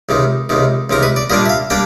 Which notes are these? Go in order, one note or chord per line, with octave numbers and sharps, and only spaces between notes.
C#2 C3 D#3
C#2 C3 D#3
C#2 C3 D#3 A#4
B4
D5
A#2 G3 A#3 D4 D#5
E5
F5
G3 A#3 D4 G5